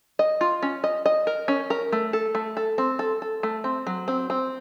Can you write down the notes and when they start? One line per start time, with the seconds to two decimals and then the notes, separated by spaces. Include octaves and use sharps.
0.19 D#5
0.41 F4
0.62 C#4
0.84 D#5
1.06 D#5
1.27 A#4
1.48 C#4
1.70 A#4
1.92 A3
2.13 A4
2.35 A3
2.57 A4
2.78 C4
2.99 A4
3.22 A4
3.43 A3
3.64 C4
3.87 F#3
4.08 C4
4.30 C4